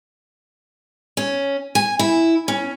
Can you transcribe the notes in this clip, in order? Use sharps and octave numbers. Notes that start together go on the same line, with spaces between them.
C#4
G#5
E4
C#4